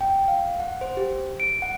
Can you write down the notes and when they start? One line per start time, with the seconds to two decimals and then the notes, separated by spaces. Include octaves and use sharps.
0.01 G5
0.28 F5
0.60 F#5
0.81 C5
0.97 G4
1.40 D7
1.62 F#5